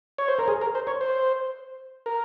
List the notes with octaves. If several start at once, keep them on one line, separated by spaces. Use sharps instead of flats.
C#5
C5
A#4
G#4
A#4
C5
C#5
C5
A#4